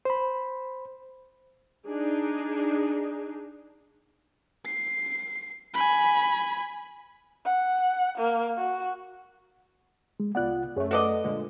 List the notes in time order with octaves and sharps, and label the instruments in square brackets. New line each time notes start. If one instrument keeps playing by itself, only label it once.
[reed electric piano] C5 B5
[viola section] D4 D#4 G#4
[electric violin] C7
G#5 B5
[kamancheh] F#5
A#3
F#4
[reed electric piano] G#3
[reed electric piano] C2 F4 F#5 [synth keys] B3 D5 F#6
[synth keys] F#2 A3 [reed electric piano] G#4 C#5
[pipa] F#4 D5 D#5 [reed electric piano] A4 B4
[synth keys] A#2 D3 G#3